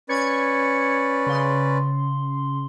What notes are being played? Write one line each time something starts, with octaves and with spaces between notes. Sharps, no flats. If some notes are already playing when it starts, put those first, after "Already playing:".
C#4 B4 D5 G#6 C#7
C#3 C6